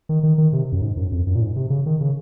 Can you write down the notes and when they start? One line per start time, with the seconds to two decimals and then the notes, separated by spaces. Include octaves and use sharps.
0.09 D#3
0.23 D#3
0.38 D#3
0.53 C3
0.72 F#2
0.82 G#2
0.97 F#2
1.12 F2
1.27 F#2
1.35 A#2
1.42 G#2
1.56 C3
1.70 C#3
1.86 D#3
2.01 C#3